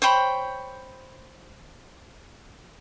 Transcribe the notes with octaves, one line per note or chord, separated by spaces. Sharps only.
C5 C#5 G5 B5